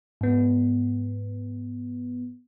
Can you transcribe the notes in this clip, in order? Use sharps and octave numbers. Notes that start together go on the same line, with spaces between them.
G#2 B3